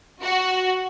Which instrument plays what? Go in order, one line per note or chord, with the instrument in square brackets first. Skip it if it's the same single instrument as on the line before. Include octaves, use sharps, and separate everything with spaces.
[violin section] F#4